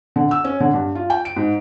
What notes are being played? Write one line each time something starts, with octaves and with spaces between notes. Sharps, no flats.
D3
E6
C#4
D3
G2
F4
G5
D7
G#2